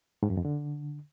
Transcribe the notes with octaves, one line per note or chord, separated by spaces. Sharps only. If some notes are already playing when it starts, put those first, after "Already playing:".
G#2
F#2
F2
D3